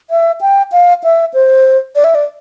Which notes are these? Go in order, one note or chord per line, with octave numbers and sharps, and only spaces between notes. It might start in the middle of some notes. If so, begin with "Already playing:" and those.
E5
G5
F5
E5
C5
D5
E5
D5